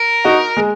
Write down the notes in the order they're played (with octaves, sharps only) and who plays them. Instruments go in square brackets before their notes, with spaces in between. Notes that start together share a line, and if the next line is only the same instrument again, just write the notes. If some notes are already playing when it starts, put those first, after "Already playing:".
Already playing: [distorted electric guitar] A#4
[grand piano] D#4 F#4
G#3